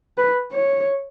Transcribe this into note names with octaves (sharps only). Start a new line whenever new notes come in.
B4
C#5